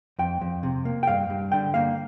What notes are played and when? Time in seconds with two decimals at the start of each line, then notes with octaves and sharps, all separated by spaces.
0.19 F2 G5
0.41 F2
0.63 C3
0.85 A#3
1.03 G5
1.07 G2 F5
1.30 G2
1.52 D3 G5
1.74 A#3 F5